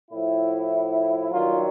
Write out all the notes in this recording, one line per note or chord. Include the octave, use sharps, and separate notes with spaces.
A2 F3 E4
G2 D#3 F#3 F4